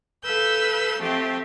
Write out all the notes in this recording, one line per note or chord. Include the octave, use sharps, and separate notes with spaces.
A4 B4 F5 E6 G6
F3 A3 C4 G4 E5